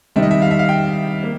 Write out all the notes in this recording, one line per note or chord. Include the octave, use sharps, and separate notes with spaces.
C3 D#3 G3 C4 D#4 E5
D#5
E5
F5
E5
F5
G5
A#3